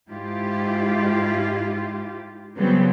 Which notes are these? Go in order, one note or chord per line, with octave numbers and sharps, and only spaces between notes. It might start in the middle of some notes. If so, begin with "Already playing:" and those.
G#2 E4 F4 G4
C#3 F#3 G3 B3 C4